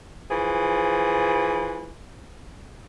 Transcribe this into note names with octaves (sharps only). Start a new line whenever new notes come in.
E3 F3 G#4